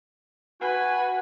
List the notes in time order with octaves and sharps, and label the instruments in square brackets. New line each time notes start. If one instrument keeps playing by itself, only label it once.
[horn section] F#4 G#5 [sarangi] B4 [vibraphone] F#5